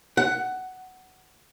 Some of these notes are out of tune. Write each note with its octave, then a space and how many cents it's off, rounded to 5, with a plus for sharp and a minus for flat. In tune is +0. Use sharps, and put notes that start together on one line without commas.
F#5 +10